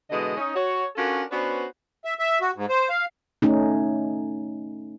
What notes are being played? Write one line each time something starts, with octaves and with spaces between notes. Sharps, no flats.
B2 D3 E3 G#3 D#5
C#4 D#4
F#4 C#5
C#4 D4 F4 F#4 A4 A#4
B3 C#4 D4 F#4 B4 C5
E5
E5
F#4
G#2
C5
F5
A3 C#4 D#4